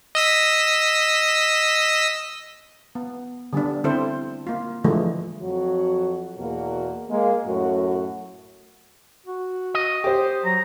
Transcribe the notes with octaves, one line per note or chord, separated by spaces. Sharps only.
D#5 E6 B6
B3
D3 G3 B3 D4
D3 C4 E4 A4 C5
A#3 F4
D3 E3 F3 G#3 A3
F2 F#3 F#4
E2 B2 A#3 F#4 A#4
G#3 A#3
F#2 A2 A3 F#4
F#4
D#5
G4 C5
F#3 A#5